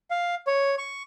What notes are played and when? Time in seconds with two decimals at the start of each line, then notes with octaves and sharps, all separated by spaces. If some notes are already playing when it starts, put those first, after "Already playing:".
0.11 F5
0.47 C#5
0.78 C#6